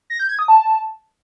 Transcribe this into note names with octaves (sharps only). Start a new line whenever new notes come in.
A#6
G6
G#6
D#6
A5